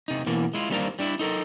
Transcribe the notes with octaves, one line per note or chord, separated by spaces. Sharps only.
C3 D#4
B2 E3 A#3
G#3 E4 F4
D#2 G3 C4 D4 A#4 F5
G3 D4 E4
D#4 A4 A#4